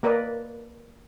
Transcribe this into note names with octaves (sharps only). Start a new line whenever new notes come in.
A#3 A#4 B4 D5 D#5